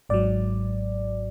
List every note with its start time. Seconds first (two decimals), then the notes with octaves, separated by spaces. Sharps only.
0.09 G#1 G#2 F#3 D5